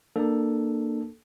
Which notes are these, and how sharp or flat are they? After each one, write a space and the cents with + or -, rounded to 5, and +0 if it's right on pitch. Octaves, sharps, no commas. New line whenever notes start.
A#3 +0 D4 +25 A4 +0